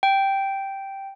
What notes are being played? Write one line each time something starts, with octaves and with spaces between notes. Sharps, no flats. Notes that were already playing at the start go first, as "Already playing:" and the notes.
G5